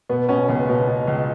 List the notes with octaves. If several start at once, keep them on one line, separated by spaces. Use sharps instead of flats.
B2 B3
B2 C#4
C#2 B3
B2 B3
B2
C#2